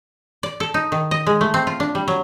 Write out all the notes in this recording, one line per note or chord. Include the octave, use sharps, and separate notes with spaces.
D5
A4
D#4
D#3
D#5
G#3
A3
C4
F4
D4
G3
F#3